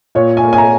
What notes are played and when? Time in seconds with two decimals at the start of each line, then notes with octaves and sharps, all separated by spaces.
0.15 A#2 C#5
0.37 G#5
0.44 A#3
0.53 G#5
0.58 A#5